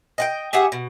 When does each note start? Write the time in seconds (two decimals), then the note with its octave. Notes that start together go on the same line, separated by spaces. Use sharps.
0.18 D#5 F#5 G5
0.53 G4 G#4 E5 F#5
0.72 B2